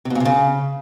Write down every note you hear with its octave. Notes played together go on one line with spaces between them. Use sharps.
C3
B2
A#2
C3
C#3